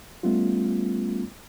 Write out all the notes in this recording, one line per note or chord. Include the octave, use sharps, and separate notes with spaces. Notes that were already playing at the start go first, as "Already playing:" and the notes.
G3 A3 B3 C#4 F4